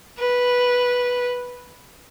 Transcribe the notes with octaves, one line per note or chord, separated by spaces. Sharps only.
B4